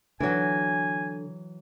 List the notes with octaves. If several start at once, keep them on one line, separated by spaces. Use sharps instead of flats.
D3 E3 F#3 G#5